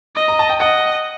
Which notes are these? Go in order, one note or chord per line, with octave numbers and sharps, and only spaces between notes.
D#5
A#5
A5
G5
D#5 F#5